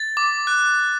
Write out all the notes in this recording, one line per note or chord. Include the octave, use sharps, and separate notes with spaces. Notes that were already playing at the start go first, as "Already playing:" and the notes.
Already playing: A6
D6
F#6